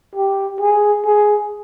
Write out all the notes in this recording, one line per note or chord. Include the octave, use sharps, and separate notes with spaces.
G4
G#4
G#4